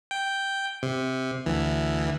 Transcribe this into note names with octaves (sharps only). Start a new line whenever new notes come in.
G5
C3
D2 E3